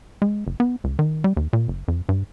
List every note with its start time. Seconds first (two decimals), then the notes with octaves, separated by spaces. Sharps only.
0.22 G#3
0.47 F#1
0.60 B3
0.84 C#2
0.99 D#3
1.24 G3
1.37 D#2
1.53 A#2
1.68 F#1
1.88 F2
2.09 G2